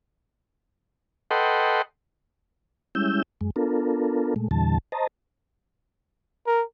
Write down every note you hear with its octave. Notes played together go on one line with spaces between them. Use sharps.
A4 B4 D#5 F#5 G5 C6
G3 G#3 C#4 E4 E6 G6
F#2 G#3
B3 D4 F4 A4 A#4
A#2 G#3 A3
E2 A#2 D3 E3 G3 A5
C5 D#5 A5 A#5
A#4